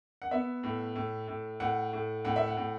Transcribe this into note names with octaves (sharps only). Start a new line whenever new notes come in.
F#5
B3 E5
A2
A2
A2
A2 F#5
A2
A2 F#5
E5
F#5
A2